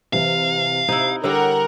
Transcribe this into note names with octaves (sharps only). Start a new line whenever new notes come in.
C3 E3 E4 F5
C3 D#4 E4
D3 G3 G4 A#4 C#5 F#5